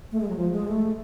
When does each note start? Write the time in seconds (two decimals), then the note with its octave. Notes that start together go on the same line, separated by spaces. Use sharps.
0.12 A3
0.21 G#3
0.28 F#3
0.36 F3
0.52 G#3
0.68 A3